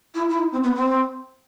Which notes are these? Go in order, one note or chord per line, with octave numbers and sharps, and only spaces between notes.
E4
E4
D#4
C4
B3
C4